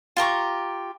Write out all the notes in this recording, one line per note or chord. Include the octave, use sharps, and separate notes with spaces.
F4 G4 A#5 C#6